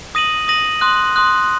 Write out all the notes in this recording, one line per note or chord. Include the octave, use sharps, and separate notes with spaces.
D#6 A#6 D#7 F#7
D#6 A#6 D#7 F#7
C6 D#6 F#6
C6 D#6 F#6